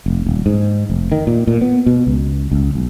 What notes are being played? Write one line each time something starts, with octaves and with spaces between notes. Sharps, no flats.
F1
D#1
G#2
F1
D#3
A#2
A#2
B3
B2
C#2
C#2
B1